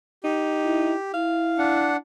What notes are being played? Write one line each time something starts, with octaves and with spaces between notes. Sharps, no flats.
D#4 G4
E4
E4 F5
D4 F#5